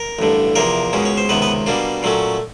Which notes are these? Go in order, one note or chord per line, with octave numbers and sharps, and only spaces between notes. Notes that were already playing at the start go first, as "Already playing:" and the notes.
Already playing: A#4
A1 G2 D3
E2 C3 F3 A#3 A#4
C#2 B2 G#3 C#4
C#5
C5
C#2 C3 D#3 B3 B4
B3 B4
B2 G3 A#3 D4
A#2 F#3 A3 C#4